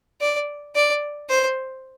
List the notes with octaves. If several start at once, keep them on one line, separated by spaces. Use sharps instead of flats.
D5
D5
C5